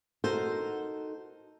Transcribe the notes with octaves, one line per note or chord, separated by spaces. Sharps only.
D#4 F#4 A4 A#4 C5